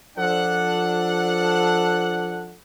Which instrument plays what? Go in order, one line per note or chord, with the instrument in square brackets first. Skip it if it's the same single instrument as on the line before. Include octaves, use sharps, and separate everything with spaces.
[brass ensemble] F3 D4 A4 F#5